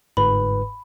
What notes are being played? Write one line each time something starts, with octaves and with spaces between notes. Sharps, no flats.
G1 G#2 B4 B5